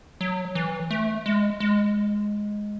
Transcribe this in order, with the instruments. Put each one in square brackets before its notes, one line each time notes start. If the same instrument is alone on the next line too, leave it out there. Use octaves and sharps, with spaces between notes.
[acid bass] F#3
E3
A3
G#3
G#3